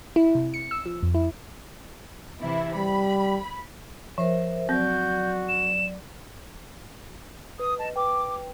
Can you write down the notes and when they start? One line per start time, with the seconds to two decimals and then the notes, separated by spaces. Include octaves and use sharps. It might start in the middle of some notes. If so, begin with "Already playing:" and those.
0.16 E4
0.35 C3
0.54 C#7
0.71 E6
0.86 F3
1.03 F2
1.15 E4
2.40 C3 E3 E4
2.76 G3 B5
4.18 F3 A#4 C5 E5
4.69 F#3 C4 F#4 D5 G6
5.49 E7
7.59 B4 D#6
7.79 D#5 A5
7.96 B4 G5 D6